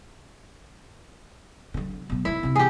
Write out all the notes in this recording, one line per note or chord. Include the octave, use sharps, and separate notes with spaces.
D3 F#3
B2 F#3
F2 D#3 E4
C3 E3
G4 G#4